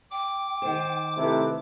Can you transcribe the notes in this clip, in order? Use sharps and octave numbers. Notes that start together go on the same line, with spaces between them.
G5 D6
D#3 C5
C3 A3 E4 B4